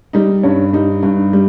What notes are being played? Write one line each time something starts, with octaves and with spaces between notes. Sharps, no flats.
G3 D#4
G2 C#4
G3 D#4
G2
G3